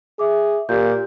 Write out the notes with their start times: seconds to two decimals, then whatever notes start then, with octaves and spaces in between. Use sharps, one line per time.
0.19 G#4 E5 D6
0.69 A#2 G4 G6